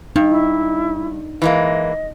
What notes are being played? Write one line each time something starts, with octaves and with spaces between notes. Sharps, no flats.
G2 D#4
E4
E3 G#3 A#3 D#5